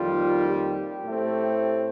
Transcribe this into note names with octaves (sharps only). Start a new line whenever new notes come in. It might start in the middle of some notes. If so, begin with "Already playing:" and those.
Already playing: F2 D#3 G3 A#3 F4
G4
A2 A3 C4